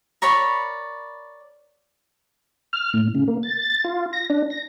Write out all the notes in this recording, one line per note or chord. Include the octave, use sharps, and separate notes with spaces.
A#4 C#5 D5 B5
F6
A2
C#3
A#3
A6
F4
A#6
D4
A#6